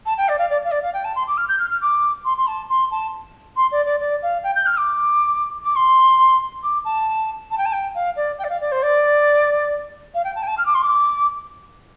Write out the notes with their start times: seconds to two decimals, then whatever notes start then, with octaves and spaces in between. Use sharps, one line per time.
0.06 A5
0.17 G5
0.28 D5
0.38 F5
0.49 D5
0.64 F5
0.71 D5
0.82 F5
0.93 G5
1.04 A5
1.15 C6
1.27 D6
1.37 F6
1.48 G6
1.59 F6
1.70 F6
1.81 D6
2.25 C6
2.37 C6
2.47 A5
2.69 C6
2.91 A5
3.56 C6
3.71 D5
3.85 D5
4.00 D5
4.22 F5
4.43 G5
4.55 G6
4.66 F6
4.77 D6
5.64 D6
5.75 C6
6.63 D6
6.84 A5
7.50 A5
7.57 G5
7.65 A5
7.72 G5
7.94 F5
8.16 D5
8.38 G5
8.44 D5
8.49 F5
8.60 D5
8.71 C5
8.82 D5
10.14 F5
10.24 G5
10.35 A5
10.43 G5
10.47 A5
10.57 F6
10.65 D6
10.74 C6
10.82 D6